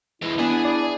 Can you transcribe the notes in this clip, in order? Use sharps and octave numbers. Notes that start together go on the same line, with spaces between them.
E3 G#3 E4
B3 D4 G#4 G#5
D5